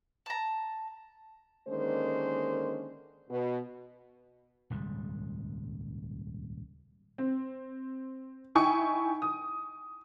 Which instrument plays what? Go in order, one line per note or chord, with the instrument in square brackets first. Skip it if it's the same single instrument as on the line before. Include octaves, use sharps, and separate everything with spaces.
[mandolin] A5 A#5
[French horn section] D3 D#3 G#3 A#3 C#4 C5
B2
[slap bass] D#1 C#2 G#2 G3
[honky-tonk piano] C4
D#4 E4 G5 G#5 C#6
D#6